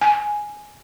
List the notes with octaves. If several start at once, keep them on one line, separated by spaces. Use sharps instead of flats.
G#5